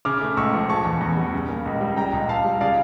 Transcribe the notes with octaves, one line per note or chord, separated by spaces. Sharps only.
C#3 D6 F6
A3
C#2 C#6 E6
F3
C#3 A5 C#6
E2
E2
G3
C#3
A#3
C#2
G3
C#3 G5 A#5
C#2
C#2 F5 A5
G3
C#3 D5 F5